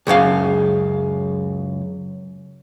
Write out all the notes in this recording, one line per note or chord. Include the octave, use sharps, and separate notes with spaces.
C#2 F#2 C#3 F5